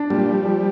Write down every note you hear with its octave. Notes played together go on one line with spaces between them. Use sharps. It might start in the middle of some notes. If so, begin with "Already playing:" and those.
Already playing: D4
A#2 G3
F3
F3